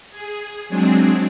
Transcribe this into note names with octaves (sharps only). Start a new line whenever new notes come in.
G#4
F#3 G#3 C4 D4 G#4